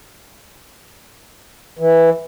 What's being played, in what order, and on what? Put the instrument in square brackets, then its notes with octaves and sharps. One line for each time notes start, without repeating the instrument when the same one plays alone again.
[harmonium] E3